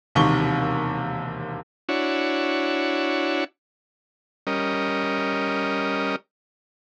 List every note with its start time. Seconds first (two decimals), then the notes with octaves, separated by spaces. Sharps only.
0.15 E1 D#2 C3 D#3 C#6 G7
1.89 D4 E4 F#4 C#5
4.47 G3 C#4 A#4 D#5